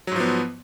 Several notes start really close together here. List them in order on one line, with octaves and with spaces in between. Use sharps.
F#3 G#2 F3 B3